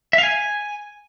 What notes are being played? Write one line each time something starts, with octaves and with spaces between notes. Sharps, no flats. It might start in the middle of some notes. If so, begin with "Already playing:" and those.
E5
F5
G#5